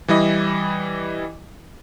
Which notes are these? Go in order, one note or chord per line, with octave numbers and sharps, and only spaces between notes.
E3 G3 E4 D#5